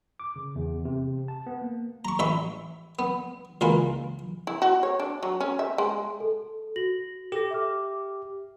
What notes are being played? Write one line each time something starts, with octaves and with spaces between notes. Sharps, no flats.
D6
C#3
E2
C3
A5
B3
A#3
A#5 C#6
A1 E5 B5 C#6
B3
C#2 E3 A#3 F4 B5
E4
F#4
C#5
D4
F#3
C#4
E5
G#3
A4
F#4 A#6 F#7
G4 A4 A#6
E5 D6 F6